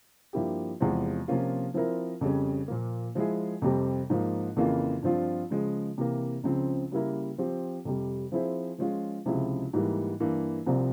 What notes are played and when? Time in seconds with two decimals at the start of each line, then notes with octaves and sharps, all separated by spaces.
0.33 G2 F3 A#3 E4 G4
0.80 E2 C3 F3 G#3
1.28 C3 F3 A#3 C#4 F4
1.74 F3 C4 E4 A#4
2.21 F2 C#3 G3 C#4
2.68 A#2 F3 A#3
3.15 F3 G#3 E4 G#4
3.62 F2 C3 G3 C4
4.10 G#2 F3 A#3
4.56 F2 C#3 E3 A#3 F4
5.03 G2 F3 C4 F4
5.50 C#3 F3 G#3
5.98 C3 E3 A#3
6.44 C#2 C#3 F3 C4
6.92 C#3 G3 A#3 E4 A#4
7.38 F3 C4 G4
7.85 F2 C3 G3
8.32 F3 C4 E4 G#4 C5
8.78 F3 G#3 C#4 F4
9.26 C#2 C3 F3 G#3 E4
9.73 G#2 E3 G3 A#3
10.20 G2 E3 A#3
10.66 C2 C3 F3 C4